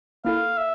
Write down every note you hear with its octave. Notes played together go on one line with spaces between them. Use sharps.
A#3 E4 A4 F5
E5